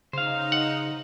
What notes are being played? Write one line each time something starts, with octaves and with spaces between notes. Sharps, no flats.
C#3 D#4 C5 F5
F#5